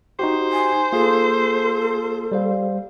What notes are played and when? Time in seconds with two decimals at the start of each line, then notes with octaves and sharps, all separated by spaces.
0.19 D#4 F#4 G4 C5
0.52 G#5
0.92 A#3 F4 G#4 A4
2.32 G3 C5 F5